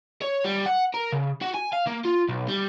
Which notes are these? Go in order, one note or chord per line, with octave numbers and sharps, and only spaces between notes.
C#5
G3
F#5
A#4
C#3
F#4
G#5
F5
A#3
F4
B1
G3